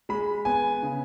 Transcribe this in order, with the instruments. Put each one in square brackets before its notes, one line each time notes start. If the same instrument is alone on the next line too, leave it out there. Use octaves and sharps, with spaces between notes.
[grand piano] G#3 B5
B3 G#5
C#3